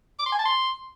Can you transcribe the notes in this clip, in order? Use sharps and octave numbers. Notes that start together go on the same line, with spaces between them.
D6
C6
G#5
A5
C6